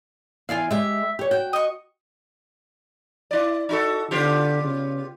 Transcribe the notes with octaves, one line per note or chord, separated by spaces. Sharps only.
E2 F4 D5 F5 G#5
G#3 G4 E5
G4 C#5
F#4 G5
D#5 C#6
E4 D5
D#4 F#4 A4
D3 B3 F4 G4
C#3